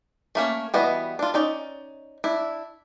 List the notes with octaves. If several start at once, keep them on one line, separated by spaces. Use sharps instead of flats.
A3 A#3 C#4
E3 G3 B3 F#4 D#5
D4 F4
C#4 D#4 D5
D4 E4